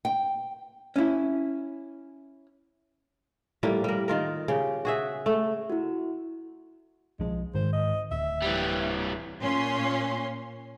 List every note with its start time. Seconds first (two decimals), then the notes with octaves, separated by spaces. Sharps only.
0.05 G5
0.96 C#4 E4
3.63 A2 F3 G3 A#3
3.84 G3 A#4
4.08 D#3 F4 A#4
4.48 C#3 G4
4.85 F#4 G#4 E5
5.26 A3
5.70 E4 F#4
7.20 B1 F3 G#3
7.55 G#2 D#3 C5
7.73 D#5
8.11 D1 E5
8.42 E3 G3
9.42 A#2 C#4 C6